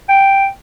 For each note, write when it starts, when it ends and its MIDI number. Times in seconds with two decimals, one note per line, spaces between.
0.09 0.46 79